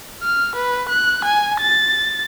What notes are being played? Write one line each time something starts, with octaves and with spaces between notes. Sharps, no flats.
F6
B4
F#6
G#5
A6